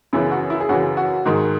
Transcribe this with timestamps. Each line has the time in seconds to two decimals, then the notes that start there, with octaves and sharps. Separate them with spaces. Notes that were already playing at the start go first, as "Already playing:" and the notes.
0.13 F#2 C#3 E3 E4
0.31 F#4
0.50 E4
0.60 G#4
0.69 F#2 C#3 E3 F#4
0.97 F#4
1.26 G#2 D#3 G#3